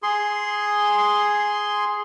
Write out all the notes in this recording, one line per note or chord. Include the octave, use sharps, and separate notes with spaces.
G#4 C6